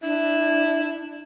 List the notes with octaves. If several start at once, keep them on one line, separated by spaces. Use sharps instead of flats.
D4 E4